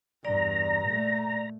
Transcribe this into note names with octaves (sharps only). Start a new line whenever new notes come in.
E2 G2 D5 A#5
A#2 A3